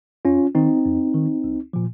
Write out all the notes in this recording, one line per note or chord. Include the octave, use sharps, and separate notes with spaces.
F2 C#4 F4
D#3 C4 D#4
F2
D#3
C2
A#2 F3